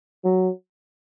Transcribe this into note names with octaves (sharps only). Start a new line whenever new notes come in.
F#3